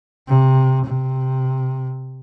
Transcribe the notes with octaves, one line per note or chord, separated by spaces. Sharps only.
C3
C3